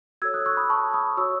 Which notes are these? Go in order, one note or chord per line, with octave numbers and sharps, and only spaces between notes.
F#4 A4 C#5 E6 G#6
D#6 F#6
C#6 E6
B5 D#6
A5 C#6
B5 D#6
F#4 C#5 C#6 E6